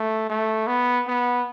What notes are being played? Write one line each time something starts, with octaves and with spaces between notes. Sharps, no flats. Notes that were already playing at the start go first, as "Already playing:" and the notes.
Already playing: A3
A3
B3
B3